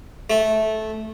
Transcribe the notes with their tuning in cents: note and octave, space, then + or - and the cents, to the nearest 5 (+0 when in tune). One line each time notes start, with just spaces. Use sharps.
A3 -15